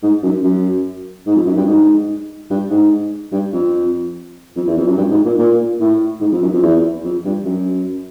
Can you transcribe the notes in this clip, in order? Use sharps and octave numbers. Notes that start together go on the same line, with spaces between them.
G#2
F#2
F#2
G#2
F2
F#2
G2
G#2
G2
G#2
G2
F2
F2
E2
F2
F#2
G2
G#2
A#2
A#2
A2
G#2
F2
F#2
F2
E2
F2
G2
F#2